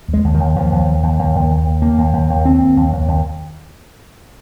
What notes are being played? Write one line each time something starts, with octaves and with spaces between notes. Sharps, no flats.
D#2
G#3
D#2
D#3
D#2
D#2 F3
D#2
D#2
D#2
D#2
D#2
D#2
D#2
D#2 A#3
D#2
D#2
D#2
D#2 C4
D#2
D#2
D#2
D#2